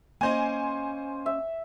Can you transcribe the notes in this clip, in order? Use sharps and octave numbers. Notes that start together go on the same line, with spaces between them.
A#3 C#4 C5 D#5 G#5
E5